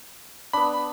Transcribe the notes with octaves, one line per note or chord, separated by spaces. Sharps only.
B3 D4 B5